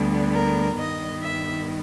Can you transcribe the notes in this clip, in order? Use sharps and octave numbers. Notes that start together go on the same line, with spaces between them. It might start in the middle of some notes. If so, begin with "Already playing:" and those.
Already playing: D2 D3 G3 B3
A#4
G2 D#3 G3 B3 D#5
E5